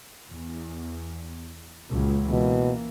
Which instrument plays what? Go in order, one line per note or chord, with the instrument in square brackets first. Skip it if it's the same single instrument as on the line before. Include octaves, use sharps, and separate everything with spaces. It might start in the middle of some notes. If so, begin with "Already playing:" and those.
[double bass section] E2
C#2 A#2 F#3
[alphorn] B2 [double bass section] E3 A#3